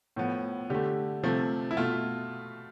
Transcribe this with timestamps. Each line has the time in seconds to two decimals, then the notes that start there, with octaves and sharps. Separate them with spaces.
0.16 A2 F3 B3
0.70 D3 A3 G4
1.23 C3 F3 A3
1.71 E4
1.77 B2 A3 F4